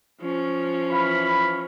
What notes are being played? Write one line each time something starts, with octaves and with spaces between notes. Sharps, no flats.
F3 C#4
E3 F5 B5